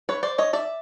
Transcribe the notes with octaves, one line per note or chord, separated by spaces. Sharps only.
B4 C#5
C5 D5
C#5 D#5
D5 E5